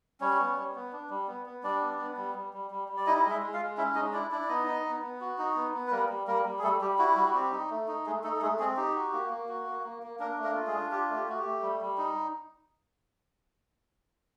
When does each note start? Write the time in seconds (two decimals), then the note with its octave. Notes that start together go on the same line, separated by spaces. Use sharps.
0.20 G3 C#4 C#5
0.39 B3
0.56 G3
0.75 B3
0.93 D4
1.10 G3
1.28 B3
1.46 B3
1.63 G3 D4 D5
1.81 B3
1.99 B3
2.17 G3
2.35 G3
2.53 G3
2.71 G3
2.88 G3
2.97 D5
3.06 D#4 E4 D#5
3.25 G#3 D#5
3.30 E4 E5
3.42 G#3
3.54 F4 F5
3.60 G#3
3.77 C#4 E4 E5
3.95 G#3 D#4 D#5
4.13 D4 E4 D5
4.31 D4 E4 D5
4.41 D5
4.49 B3 D#4 D#5
4.66 D#4
4.85 B3
5.02 B3
5.21 F#4
5.38 D#4
5.56 B3
5.74 B3
5.87 B4
5.91 G3 A#3 A#4
6.09 G3
6.27 G3 A#3 A#4
6.45 G3
6.59 G#4
6.63 G3 A3 A4
6.81 G3 G4
6.99 E4 F#4
7.17 G3 F#4
7.27 F#4
7.34 C4 G4
7.52 D#4
7.70 A3
7.88 D#4
8.06 G#3 A3 G#4
8.23 A3 D#4 A4
8.36 A4
8.41 G#3 A3 G#4
8.59 G#3 C4 G#4
8.77 D#4 G4
8.95 F#4
9.13 A#3
9.30 A#3
9.49 F#4
9.67 A#3
9.84 A#3
10.03 A#3
10.19 A#3 D4 A#4
10.38 A3
10.44 A#3 A#4
10.55 F4
10.67 G#3 G#4
10.73 D4
10.91 F4 G4
11.09 A3
11.15 G4
11.27 A3 F#4
11.39 G4
11.45 A3
11.62 G3
11.81 G3
11.98 D#4